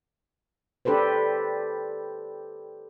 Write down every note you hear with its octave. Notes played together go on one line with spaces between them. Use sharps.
D4 G4 A4 B4 C5